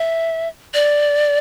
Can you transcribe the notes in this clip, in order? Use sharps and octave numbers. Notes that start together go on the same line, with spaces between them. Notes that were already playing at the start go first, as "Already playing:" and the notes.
Already playing: E5
D5